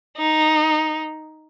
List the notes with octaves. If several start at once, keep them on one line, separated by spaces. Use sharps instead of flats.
D#4